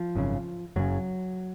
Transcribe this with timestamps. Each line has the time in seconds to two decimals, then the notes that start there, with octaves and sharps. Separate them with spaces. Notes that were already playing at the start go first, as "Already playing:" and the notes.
Already playing: F3
0.15 G#1 F#2 C#3
0.76 F#1 F#2 C#3 F#3